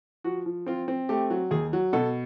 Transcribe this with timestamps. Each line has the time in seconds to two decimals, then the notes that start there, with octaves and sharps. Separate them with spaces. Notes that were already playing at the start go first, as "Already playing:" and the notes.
0.24 F3 F#4
0.46 F3
0.66 C4 F4
0.88 C4
1.09 A3 G4
1.30 F#3
1.51 D#2 G#4
1.73 F#3
1.93 B2 A4